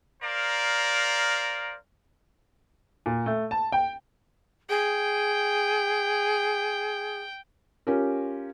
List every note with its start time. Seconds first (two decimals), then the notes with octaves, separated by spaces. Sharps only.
0.22 A#4 C5 D5 F5 A#5
3.06 A#2
3.26 A3
3.51 A5
3.72 G5
4.69 G#4 G5
7.87 C#4 F4 G4 A#4